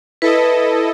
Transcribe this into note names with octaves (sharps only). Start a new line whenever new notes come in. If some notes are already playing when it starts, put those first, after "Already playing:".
E4 A4 B4 D#5